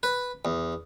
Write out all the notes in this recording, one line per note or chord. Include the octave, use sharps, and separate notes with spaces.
B4
E2